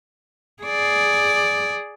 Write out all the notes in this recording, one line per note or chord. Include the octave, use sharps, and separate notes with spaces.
G#4 D5